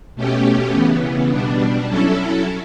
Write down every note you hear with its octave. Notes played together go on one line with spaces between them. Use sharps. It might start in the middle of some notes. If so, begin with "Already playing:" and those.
B2 A3 C#4 G4
C#3 E3 B3
B2 G3 D4
F#3 C#4 E4 A4